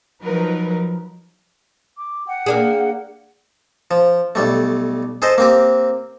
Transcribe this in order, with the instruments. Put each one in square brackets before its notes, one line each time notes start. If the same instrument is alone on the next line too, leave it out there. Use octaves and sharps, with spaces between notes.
[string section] F3 F#3 D#4 A#4 B4
[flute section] D6
F#5 G5
[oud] A#3 D4 G#4
[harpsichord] F3
B1 G3 A3
G#4 A4 C5 D#5
A#3 C4 G4